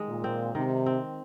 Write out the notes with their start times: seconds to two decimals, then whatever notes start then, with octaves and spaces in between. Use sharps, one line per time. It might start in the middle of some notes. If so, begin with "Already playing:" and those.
Already playing: D#3 G#3
0.08 A#2
0.24 C4
0.55 C3 D#3
0.86 C4